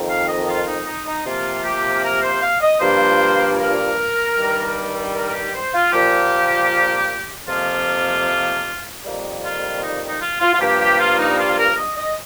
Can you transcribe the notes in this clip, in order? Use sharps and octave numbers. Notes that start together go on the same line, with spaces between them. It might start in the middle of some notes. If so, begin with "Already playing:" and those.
Already playing: F2 D#3 A#3
F5
D#5
F4
D#4
D#4
D#4
C3 F3 A#3 F4
G4
A#4
C5
F5
D#5
G2 F3 A#3 C5
A#4
G2 D#3 G3
A#4
A#4
G4
C5
F4
A#2 F3 A#3 G4
F2 C3 F3 A#3 F4
F2 D#3 G3 A#3
F4
D#4
D#4
F4
F4
F4
G2 F3 A#3 G4
G4
F4
D#4
F4
A#4
D#5
D#5